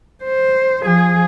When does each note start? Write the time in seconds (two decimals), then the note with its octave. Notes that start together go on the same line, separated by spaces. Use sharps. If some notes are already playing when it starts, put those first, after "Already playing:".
0.24 C5
0.82 F3 G#4